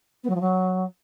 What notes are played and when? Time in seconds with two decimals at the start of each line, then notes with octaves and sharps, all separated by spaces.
0.24 B3
0.29 F#3
0.35 F3
0.41 F#3